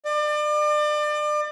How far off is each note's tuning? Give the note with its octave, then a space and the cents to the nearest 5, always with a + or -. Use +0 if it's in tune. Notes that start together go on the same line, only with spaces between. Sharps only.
D5 +35